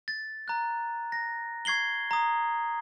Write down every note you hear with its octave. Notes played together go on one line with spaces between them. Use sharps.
A6
A#5 F#6
A#6
C#6 G#6 C7 F#7 G7
A#5 D#6